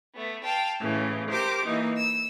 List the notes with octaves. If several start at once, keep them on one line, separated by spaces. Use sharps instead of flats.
A3 B3
F5 G5 A5
A2 C#3 E3
G4 A#4 C5 D6
E3 A#3 D#4
E6